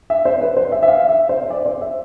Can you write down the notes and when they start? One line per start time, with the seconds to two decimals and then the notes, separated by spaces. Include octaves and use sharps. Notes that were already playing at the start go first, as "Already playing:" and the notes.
0.10 E5
0.25 C5
0.41 B4
0.57 C5
0.72 E5
0.83 E5
0.88 F5
1.09 E5
1.29 C5
1.50 D5
1.66 C5
1.81 E5